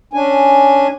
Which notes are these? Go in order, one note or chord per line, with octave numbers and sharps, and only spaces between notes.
C#4 D4 G#5